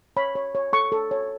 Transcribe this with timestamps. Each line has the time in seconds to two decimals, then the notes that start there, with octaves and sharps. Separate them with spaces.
0.17 C#5 B5
0.35 C#5
0.55 C#5
0.73 A4 C#6
0.92 A4
1.11 C#5